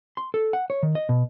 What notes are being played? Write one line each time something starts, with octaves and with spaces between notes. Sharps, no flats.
C6
A4
F#5
C#5
D#3
D#5
B2